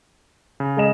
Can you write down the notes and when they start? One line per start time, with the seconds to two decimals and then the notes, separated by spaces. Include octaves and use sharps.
0.60 C#3
0.77 G#3 D#5 E7